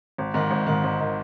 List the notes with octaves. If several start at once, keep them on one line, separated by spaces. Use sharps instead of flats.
G#1
G#2 D#3
G#1
G#2 D#3
G#1
D#3